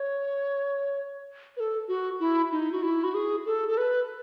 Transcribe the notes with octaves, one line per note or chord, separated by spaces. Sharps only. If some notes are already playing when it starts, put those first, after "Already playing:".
Already playing: C#5
B4
A4
F#4
E4
D#4
F#4
E4
F#4
G#4
A4
A4
B4